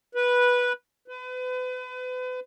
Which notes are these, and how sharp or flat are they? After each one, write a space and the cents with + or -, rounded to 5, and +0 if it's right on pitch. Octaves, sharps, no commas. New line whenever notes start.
B4 -10
B4 +35